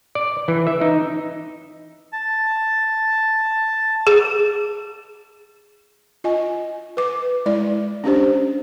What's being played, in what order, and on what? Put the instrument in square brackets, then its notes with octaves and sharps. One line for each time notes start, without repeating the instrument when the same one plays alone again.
[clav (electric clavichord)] D5
E3
E5
D#4
[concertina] A5
[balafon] G#4
F4 D#5 G#5
B4 D6
G#3 E4 D5
C#4 D4 G4 C5